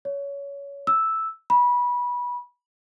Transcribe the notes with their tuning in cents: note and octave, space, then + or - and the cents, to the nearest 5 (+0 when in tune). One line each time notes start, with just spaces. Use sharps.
C#5 +20
E6 -5
B5 -20